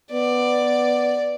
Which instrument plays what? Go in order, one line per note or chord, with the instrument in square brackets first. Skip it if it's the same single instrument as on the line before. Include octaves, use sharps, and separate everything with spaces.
[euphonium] B3 [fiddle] D5